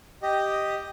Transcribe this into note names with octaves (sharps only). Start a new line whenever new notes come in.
G4 D#5